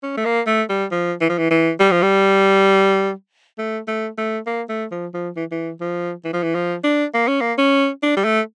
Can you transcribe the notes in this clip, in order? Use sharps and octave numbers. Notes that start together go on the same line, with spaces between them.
C#4
A3
A#3
A3
G3
F3
E3
F3
E3
E3
G3
F3
G3
A3
A3
A3
A#3
A3
F3
F3
E3
E3
F3
E3
F3
E3
F3
D4
A#3
C#4
A#3
C#4
D4
G3
A3